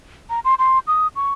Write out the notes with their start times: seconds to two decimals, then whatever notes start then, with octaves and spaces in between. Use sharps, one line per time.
0.30 A#5
0.45 C6
0.59 C6
0.87 D#6
1.16 C#6